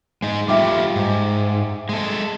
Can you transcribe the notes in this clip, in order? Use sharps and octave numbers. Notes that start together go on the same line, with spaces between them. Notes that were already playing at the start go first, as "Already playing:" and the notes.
G#3 D#4
G3 A3 F4 E5 G5 D6
G#2
G#3 A4